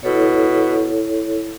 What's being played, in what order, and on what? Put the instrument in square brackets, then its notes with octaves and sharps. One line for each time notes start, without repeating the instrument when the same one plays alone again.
[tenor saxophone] B2 [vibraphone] E4 A4 C#5